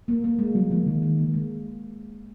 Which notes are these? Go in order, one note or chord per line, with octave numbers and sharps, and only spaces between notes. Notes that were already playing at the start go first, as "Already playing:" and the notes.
A#3
A#3
G#3
F#3 G#3
F3 A#3
D#3 G#3
A#3
A#3
G#3